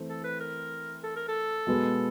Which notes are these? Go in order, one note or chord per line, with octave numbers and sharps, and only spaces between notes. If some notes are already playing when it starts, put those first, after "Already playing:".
Already playing: E3 A3 C4
A4
B4
A#4
A4
A#4
A4
B2 G#3 B3